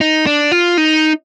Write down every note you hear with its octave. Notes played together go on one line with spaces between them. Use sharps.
D#4
D4
F4
D#4